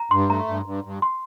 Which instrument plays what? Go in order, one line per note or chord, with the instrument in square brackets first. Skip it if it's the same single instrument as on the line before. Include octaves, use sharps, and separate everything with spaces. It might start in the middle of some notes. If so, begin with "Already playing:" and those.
Already playing: [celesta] A#5
[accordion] G2 [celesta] C6
[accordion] A3 [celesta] A#5
[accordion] G2
G2
G2
[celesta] C6